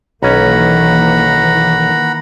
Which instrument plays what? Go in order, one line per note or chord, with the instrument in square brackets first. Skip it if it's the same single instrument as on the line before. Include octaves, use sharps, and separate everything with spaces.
[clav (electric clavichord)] B1 C#4 [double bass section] D#3 E3 A#3 [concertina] F#5 A#5 B5